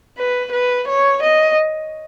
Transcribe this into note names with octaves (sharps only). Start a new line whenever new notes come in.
B4
B4
C#5
D#5